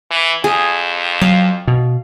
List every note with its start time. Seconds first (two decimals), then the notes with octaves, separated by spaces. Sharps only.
0.11 E3
0.44 F2 G#4
1.21 F#3 F5
1.68 B2